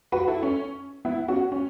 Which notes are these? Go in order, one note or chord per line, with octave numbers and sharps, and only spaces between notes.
F#4 B4
E4 A4
C#4
B3 E4
C#4 F#4
C#4